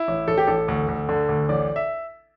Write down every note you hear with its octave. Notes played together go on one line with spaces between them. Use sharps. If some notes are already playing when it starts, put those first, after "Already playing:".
Already playing: E4
A1
A1 A4
G4
A1 A4
D2
D2
D3
D2
A1 D5
E5